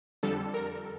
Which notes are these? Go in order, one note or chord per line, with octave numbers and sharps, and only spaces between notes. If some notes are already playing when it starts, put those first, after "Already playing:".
F2 D3 G3 A4
A#4